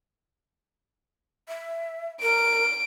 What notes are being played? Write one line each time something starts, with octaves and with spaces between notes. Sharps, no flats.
E5
A#4 D7